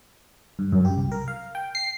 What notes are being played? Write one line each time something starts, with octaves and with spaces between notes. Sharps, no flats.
G2
F#2
G4
C2
A#4
F5
G5
C7